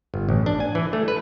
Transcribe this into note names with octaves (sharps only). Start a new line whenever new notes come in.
G1
A1
D4
G#5
E3
A3
B4